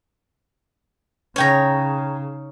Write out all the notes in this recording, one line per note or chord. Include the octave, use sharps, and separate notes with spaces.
C#3 C#4 D#4 C#5 G5 A#5